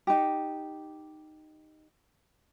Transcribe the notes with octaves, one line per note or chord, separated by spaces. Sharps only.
D#4 G4